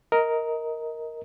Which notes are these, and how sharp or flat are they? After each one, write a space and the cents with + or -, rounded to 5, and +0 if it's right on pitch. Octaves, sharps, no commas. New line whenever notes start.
A#4 +0 D#5 +20